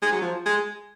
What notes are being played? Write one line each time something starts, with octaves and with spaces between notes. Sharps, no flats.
G#3
F#3
F3
G#3